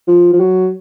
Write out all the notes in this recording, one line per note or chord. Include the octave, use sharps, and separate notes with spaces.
F3
F3
F#3